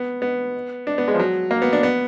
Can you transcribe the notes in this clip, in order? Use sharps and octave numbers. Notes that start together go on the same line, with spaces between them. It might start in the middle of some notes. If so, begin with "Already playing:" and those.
Already playing: B3
B3
D4
B3
G#3
F3
F#3
A#3
B3
D4
B3